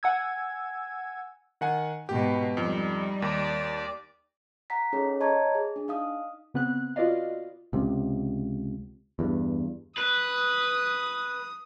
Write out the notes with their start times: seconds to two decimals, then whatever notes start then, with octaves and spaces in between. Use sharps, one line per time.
0.03 F#5 G#5 E6 G#6
1.61 D#3 F#5 G#5
2.09 G#2 B2 G4
2.57 F2 G3 D#4
3.22 D#2 D5
4.70 F#5 A#5 B6
4.93 C#4 D#4 G#4 A4 C#5
5.20 C#5 D#5 A5 A#5 C#6 G#6
5.55 G#4
5.76 D4
5.88 D#4 F5 D#6
6.54 C#3 B3 C4 F#6
6.96 F4 F#4 B4 D5 D#5 F5
7.73 C#2 C3
9.19 E2 G2
9.97 B4 D#6